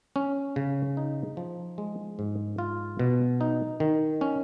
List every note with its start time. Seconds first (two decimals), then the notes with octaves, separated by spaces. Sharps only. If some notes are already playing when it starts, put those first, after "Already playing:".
0.16 C#4
0.56 C#3
0.97 D#4
1.37 F3
1.78 G#3
2.19 G#2
2.58 F4
2.99 B2
3.41 D#4
3.80 D#3
4.21 C#4